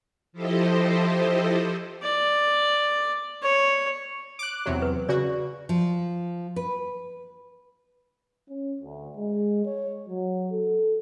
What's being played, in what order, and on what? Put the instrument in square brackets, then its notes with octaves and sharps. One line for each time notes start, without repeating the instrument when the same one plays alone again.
[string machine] F3 E4 G4 A4 C5 D#5
[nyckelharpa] D5
C#5
[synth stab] D6 F#6
E2 C3 F#3
[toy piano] B4
[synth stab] C#3 F#4 [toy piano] D5
[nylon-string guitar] F3
B4
[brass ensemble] C#4
D2
G#3
C#5
F#3
A4